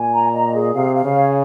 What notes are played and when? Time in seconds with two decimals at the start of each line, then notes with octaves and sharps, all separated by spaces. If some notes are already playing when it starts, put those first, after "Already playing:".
Already playing: A#2 G#5
0.13 A#5
0.33 D#5
0.54 G#4
0.74 C3 F5
0.94 F5
1.04 C#3
1.15 C#5